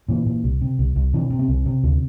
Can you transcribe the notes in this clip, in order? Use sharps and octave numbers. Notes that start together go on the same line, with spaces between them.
A#2 E3
A#2
C2
C3
C2
C2
C3 E3
C3
C4
C2
C3
D2